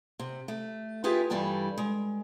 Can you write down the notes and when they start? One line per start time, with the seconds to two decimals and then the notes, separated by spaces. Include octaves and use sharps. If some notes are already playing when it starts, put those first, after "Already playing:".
0.19 C3
0.48 A3
1.04 E4 F4 G4 G#4 B4
1.30 G2 E3 G3 A4 G5 A5
1.78 G#3